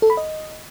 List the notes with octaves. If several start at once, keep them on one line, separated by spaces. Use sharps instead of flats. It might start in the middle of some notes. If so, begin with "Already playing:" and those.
A4
B5
D#5